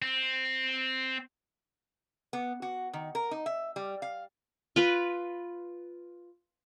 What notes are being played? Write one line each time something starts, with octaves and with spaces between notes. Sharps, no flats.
C4
B3
F#4
D#3
A#4
D#4
E5
G3
F5
F4 B4